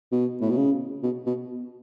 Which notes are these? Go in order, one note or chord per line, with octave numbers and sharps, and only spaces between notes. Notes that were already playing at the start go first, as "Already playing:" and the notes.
B2
A2
B2
C#3
B2
B2